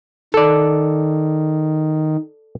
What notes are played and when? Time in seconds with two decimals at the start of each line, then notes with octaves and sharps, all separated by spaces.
0.34 D#3 A4 D5